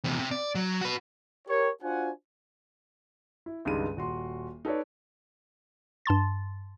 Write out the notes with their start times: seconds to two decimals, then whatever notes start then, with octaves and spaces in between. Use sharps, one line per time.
0.04 E2 C3
0.19 C3
0.31 D5
0.55 F#3
0.81 F#4 B4
1.48 G4 A#4 C#5
1.82 D4 F4 F#4 C5 F#5 G#5
3.46 E4
3.65 C#2 G2 D#3 G#3 D#7
3.97 D#1 F#4 C6
4.65 D#4 A4 B4 C#5 D5
6.06 G2 A5 C6 A6